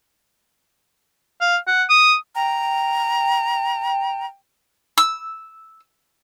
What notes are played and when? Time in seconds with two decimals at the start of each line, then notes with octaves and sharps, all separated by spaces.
1.41 F5
1.67 F#5
1.90 D#6
2.35 G5 A#5
4.98 E6